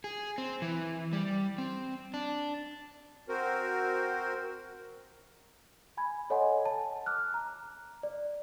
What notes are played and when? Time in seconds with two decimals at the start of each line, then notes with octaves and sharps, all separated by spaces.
0.04 G#4
0.38 C4
0.62 E3
1.13 G3
1.58 C4
2.14 D4
3.29 C4 F#4 A#4 C5
5.97 G#5 B5 G#6
6.30 A4 C#5 D#5 F#5 G#5 C6
6.66 A5
7.06 D6 F6 F#6
7.34 A#5
8.03 D5